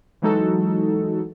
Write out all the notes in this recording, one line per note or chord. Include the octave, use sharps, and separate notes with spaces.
E3 F#3 G#3 D#4 F#4 A4